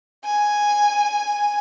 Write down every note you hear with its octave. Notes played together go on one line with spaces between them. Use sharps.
G#5